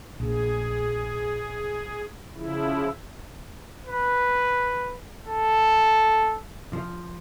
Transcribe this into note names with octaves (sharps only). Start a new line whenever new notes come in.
A#1 G#4
C#3 F3 E4
B4
A4
F3